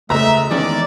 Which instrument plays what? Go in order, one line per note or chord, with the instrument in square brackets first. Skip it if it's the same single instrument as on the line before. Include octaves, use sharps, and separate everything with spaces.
[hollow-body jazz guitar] C#2 A3 [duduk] G#3 [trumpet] E5 [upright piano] A#5
[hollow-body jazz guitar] E2 D#3 C#4 [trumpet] D5